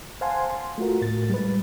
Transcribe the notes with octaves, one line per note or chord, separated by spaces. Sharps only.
C5 F5 F#5 G#5 A5 C6
C6
A3 F4 F#4 A#4
A2 A6
G3 G#3 B4